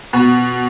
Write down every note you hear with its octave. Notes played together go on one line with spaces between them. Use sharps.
B2